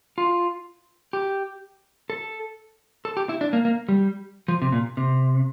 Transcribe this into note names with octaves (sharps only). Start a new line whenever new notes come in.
F4
G4
A4
A4
G4
E4
D4
A#3
A#3
G3
F3
C3
A#2
C3